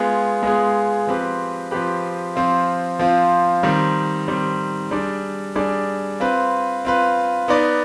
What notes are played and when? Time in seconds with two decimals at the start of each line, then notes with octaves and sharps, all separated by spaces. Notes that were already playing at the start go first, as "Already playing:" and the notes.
Already playing: G#3 B3 F4 G#4
0.43 G#3 B3 F4 G#4
1.07 F3 C4 G4 B4
1.71 F3 C4 G4 B4
2.36 F3 C4 F4
2.99 F3 C4 F4
3.63 D#3 G3 C4
4.28 D#3 G3 C4
4.91 G3 D4 G#4 D5
5.56 G3 D4 G#4 D5
6.20 C4 F4 B4
6.85 C4 F4 B4
7.48 B3 D#4 B4 D5